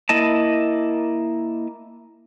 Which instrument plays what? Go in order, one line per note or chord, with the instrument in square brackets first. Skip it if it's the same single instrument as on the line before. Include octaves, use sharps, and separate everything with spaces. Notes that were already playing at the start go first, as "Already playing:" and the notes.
[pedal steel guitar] A#3 E4 D#5 A5